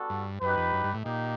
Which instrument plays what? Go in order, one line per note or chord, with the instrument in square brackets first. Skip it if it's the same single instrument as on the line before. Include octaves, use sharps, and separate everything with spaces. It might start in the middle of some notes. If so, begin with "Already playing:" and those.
Already playing: [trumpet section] G3 B3 D4 F#4 A4
[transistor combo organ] G2
[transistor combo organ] F#2 [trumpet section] D#4 G4 B4
[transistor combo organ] F2
F#2
G2
A2
[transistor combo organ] A#2 [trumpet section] D#4 G4